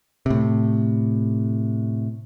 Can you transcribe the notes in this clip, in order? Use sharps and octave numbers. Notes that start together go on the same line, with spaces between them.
A2 C3